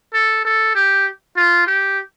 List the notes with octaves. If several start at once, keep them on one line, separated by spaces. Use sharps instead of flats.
A4
A4
G4
F4
G4